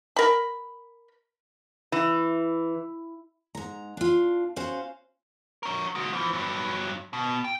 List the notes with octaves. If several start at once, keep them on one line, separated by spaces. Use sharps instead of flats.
A#4 B5
E3
G#2 A#5
D4 F4
C#4 F#4 C5 F5
A#4 C#5
G#3 F#4
E3 F3
G2 F#3
B2
G5